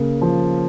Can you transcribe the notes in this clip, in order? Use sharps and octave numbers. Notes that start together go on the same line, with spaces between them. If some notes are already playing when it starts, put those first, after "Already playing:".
Already playing: C#3 A#3
F3